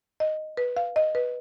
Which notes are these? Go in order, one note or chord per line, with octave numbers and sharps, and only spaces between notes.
D#5
B4
F5
D#5
B4